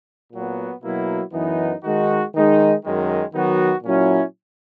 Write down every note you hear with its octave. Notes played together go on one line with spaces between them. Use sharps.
A#2 F#3 B3
B2 F#3 A#3 E4
F#2 E3 B3 D#4
D#3 G#3 D#4 F#4
D#3 G#3 D#4
F#2 D#3 G#3
D#3 F#3 B3 D#4 F#4
A#2 F#3 C#4 E4